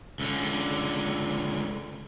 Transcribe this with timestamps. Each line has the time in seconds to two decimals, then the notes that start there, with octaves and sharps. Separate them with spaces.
0.20 C#2 D3